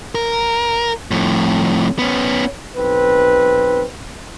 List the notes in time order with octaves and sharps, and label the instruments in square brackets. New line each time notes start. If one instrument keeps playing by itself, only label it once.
[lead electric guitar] A#4
F2 A2
B3 C#4
[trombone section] B1 C4 B4